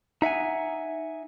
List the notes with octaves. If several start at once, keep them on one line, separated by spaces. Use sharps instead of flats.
D#4 E5 F#5 G#5